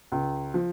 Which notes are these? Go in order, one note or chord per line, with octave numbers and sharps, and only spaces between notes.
C#2
F3